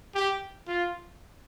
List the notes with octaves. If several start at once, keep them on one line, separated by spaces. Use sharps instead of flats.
G4
F4